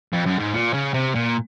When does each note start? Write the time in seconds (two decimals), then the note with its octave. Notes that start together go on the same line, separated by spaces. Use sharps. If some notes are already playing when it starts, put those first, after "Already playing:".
0.13 F2
0.25 F#2
0.39 G#2
0.53 A#2
0.74 C#3
0.94 C3
1.15 A#2